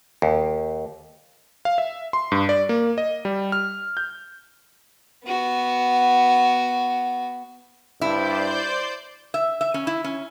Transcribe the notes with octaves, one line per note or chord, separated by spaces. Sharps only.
D#2
F5
E5
C6
G2
D5
A#3
D#5
G3
F6
G6
B3 F#4
G2 E4 C5 D5 G6
E5
E5
C#4
E4
C#4